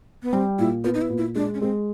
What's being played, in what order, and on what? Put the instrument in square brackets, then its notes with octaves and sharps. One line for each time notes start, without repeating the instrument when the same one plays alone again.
[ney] B3
[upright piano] G3 [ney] C4
[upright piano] A#2 [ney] E4
[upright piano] B3 [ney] F4
[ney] D#4
E4
[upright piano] A#2
[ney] E4
[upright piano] G#3 [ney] D4
[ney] C#4
[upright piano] G#3 [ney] C4